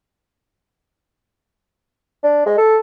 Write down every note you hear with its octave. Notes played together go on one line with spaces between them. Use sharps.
D4
G#3
A4